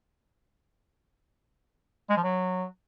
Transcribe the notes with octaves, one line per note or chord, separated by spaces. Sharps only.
G#3
F3
F#3